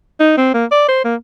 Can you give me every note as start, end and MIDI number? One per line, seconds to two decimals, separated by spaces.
0.20 0.35 63
0.38 0.54 60
0.54 0.65 58
0.72 0.87 74
0.88 1.02 72
1.04 1.15 58